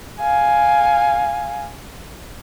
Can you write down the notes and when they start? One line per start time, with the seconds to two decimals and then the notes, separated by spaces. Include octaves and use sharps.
0.21 F5 G#5